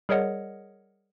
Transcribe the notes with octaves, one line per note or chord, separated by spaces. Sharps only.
G3 G#4 A#4 C#5 D#5 F#5